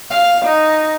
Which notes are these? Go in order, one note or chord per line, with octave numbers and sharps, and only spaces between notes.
F5
D#4